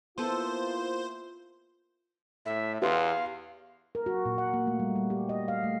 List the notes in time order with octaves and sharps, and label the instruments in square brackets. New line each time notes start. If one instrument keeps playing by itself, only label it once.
[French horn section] A#3 E4 F4 [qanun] B3 A4 [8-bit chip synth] C5
[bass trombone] A2 [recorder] E5
[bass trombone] E2 [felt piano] G4 B4 C6 [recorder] F5
[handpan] A#4
F#4
A#2
F#5
A#3
A3
G3
G3
G4
D#5
F5
A3